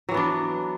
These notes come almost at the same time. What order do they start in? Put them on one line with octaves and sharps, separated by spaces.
F#3 E3 B3 D4